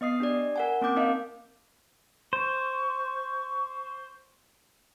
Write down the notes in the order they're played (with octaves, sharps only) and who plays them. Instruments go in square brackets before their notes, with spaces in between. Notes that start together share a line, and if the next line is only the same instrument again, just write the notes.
[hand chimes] B3 D#5 D#6 C7
D4 G4 D5
A#4 F#5 G#5
A#3 C4 C#4 D6 G6
D#4 A#4 D#5 F5
[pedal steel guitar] C5 [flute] C#6